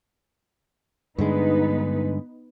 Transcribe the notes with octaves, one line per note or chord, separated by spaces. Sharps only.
G2 D3 G#3 B3 D#4 B4